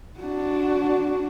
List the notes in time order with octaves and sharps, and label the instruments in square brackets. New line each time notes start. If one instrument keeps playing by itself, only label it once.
[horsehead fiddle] D4 F#4